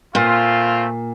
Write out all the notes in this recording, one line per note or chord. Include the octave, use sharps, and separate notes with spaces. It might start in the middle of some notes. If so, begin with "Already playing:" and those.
A#2 A3 C4 F4